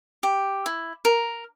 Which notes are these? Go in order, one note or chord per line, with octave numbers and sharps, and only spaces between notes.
G4
E4
A#4